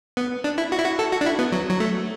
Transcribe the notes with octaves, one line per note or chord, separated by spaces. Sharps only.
B3
D4
E4
F#4
E4
F#4
A4
F#4
D4
E4
B3
F#3
F#3
A3